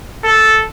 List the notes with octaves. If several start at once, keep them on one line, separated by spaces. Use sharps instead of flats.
A4